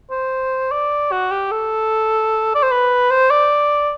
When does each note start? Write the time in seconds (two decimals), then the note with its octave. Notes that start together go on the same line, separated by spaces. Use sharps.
0.11 C5
0.71 D5
1.12 F#4
1.31 G4
1.51 A4
2.55 D5
2.63 C5
2.71 B4
3.11 C5
3.31 D5